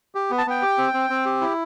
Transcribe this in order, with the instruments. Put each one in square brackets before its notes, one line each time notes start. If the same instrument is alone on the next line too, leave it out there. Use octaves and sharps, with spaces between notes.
[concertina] G4
B3
A5
B3 G5
G4
C4
C4
C4
G4
E4